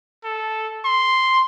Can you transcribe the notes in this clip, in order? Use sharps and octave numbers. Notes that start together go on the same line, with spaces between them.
A4
C6